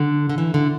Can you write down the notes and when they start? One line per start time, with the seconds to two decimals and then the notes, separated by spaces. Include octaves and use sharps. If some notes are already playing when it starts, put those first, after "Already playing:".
Already playing: D3
0.29 D3
0.38 E3
0.54 D3